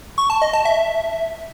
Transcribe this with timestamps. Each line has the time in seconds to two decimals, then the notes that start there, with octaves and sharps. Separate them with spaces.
0.18 C#6
0.30 A5
0.42 D#5
0.53 A5
0.65 E5